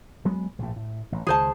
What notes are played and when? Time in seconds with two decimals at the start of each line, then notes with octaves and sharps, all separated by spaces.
0.25 F#3 G#3 B3
0.59 A#1 A2
0.76 A2
1.12 A1
1.27 C#2 D#3 G#4 C5 A5